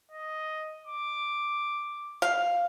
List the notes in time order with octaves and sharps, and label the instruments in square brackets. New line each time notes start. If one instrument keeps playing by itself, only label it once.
[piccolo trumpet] D#5
D6
[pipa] F5